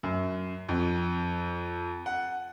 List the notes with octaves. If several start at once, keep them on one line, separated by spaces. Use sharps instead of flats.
F#2
F2
F#5